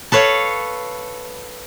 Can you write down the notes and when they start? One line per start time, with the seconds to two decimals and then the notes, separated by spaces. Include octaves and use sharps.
0.12 A4 B4 C#5 F5